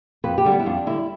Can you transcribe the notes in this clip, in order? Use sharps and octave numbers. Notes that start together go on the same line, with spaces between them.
F2 B4
G4
D3 G3
B3
E4
F2 D4
D3 G3 E4